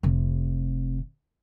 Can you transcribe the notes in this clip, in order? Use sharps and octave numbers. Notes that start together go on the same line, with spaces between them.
F1 C3